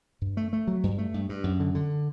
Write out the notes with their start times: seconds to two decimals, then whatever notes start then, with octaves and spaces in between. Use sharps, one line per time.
0.22 G2
0.37 A3
0.53 A3
0.67 F#3
0.83 G2
0.98 A3
1.14 G2
1.29 G2
1.44 F#2
1.60 D3
1.75 D3